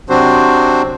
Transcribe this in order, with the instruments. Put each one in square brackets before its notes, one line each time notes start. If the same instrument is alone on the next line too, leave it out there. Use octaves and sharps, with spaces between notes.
[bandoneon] C3 F#3 C4 D4 F#4 C5